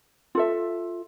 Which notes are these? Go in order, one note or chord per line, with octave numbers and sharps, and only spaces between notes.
F4 A4 E5